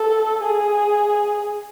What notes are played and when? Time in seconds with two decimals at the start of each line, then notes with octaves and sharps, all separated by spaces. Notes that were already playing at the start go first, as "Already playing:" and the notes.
Already playing: A4
0.43 G#4